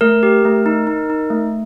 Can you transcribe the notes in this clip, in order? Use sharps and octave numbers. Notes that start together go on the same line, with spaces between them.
A3 A#4
G4
A3
D#4
D#4
D#4
A3